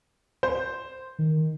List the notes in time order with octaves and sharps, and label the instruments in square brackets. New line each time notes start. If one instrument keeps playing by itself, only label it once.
[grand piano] C5
[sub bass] D#3